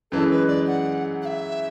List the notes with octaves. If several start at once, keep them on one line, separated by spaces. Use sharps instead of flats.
F#2 E3 G#3 A4
B4
D5
F#5
F#5
E5